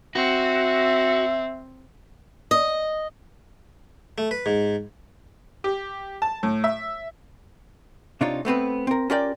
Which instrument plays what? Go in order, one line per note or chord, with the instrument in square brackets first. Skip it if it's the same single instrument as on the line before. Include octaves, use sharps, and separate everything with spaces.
[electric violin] C4 [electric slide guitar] F#4 [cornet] E5
[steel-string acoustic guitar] D#5
[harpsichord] A3
B4
G#2
[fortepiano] G4
A5
A2
E5
[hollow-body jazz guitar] C3 D4 D#4 F4 C#5
A3 B3 C4 B4
C4 A#4
C#4 F4 G4 A#4 D5 G5